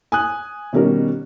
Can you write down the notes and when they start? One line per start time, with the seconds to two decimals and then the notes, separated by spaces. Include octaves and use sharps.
0.12 G#5 D#6 F#6
0.73 B2 D#3 G3 C#4 A#4